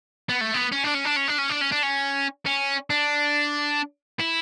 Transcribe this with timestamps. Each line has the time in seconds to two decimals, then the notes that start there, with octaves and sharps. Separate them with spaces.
0.29 B3
0.41 A3
0.54 B3
0.72 C#4
0.84 D4
0.95 C#4
1.05 D4
1.17 C#4
1.28 D4
1.39 C#4
1.50 D4
1.61 C#4
1.72 D4
1.83 C#4
2.46 C#4
2.90 D4
4.20 E4